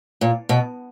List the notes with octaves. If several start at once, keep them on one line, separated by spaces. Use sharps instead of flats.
A#2
B2